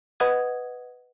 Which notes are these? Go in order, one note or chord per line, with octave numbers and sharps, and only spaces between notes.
B4 D#5 F#5 D#6 G#6